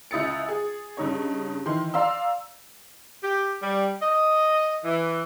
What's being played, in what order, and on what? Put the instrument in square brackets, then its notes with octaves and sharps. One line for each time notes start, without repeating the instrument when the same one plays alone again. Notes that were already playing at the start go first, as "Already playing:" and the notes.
[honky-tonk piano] C#2 E4 D#6 A6 C#7
G#4
G2 C#3 D#4 C#5
D#3 E3 C6
D5 F5 A#5 C6 E6
[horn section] G4
G3
D#5
E3